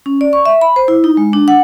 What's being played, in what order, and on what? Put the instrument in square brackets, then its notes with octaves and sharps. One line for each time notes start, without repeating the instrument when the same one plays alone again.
[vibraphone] C#4
D5
C#6
E5
B5
C5
E4
D#4
G#3
D4
F#5